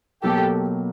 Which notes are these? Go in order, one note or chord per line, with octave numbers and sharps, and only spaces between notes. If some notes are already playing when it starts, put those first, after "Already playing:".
B2 F#3 A#3 G4 A4